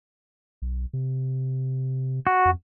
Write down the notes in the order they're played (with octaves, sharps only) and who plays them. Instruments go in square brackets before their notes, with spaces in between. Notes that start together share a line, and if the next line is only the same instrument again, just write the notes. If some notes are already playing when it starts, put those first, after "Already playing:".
[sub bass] B1
C3
[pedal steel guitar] F#4
[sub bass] F2